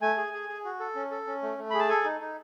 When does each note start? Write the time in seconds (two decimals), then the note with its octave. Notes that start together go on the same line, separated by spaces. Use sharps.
0.02 A3 G#5
0.17 G#4
0.33 G#4
0.49 G#4
0.65 F#4
0.80 A4
0.95 C#4
1.11 A4
1.27 C#4
1.42 A3
1.58 A3
1.70 G#4 B5
1.79 A5
1.89 A4 G#5
2.04 D#4
2.21 D#4